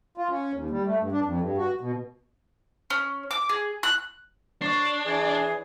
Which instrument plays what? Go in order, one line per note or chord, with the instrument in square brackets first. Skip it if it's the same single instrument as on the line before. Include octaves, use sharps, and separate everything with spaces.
[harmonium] F4
C#4
D#2
G3
A3
G2
D4
F2
G2
F#4
B2
[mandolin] C#4
D6
G#4
F#6
[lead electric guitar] D4 [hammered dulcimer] C#5 [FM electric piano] D5 C7
[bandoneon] E3 G#4